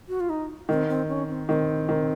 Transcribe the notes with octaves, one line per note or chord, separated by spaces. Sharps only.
F#4
F4
D#4
D#3 C4
C4
C#4
C4
D#3 C4
D#3